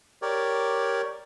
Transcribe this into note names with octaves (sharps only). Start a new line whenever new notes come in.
G4 A#4 C#5 D5